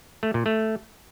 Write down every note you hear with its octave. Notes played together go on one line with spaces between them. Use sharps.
A3
A#2
A3